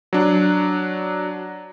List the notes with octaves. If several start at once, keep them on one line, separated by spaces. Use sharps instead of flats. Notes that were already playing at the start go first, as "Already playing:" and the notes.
F#3 D4